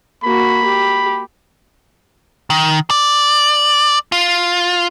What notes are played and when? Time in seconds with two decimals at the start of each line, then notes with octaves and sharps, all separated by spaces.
0.24 A#3 F#4 B5
0.65 G4
2.50 D#3
2.90 D5
4.12 F4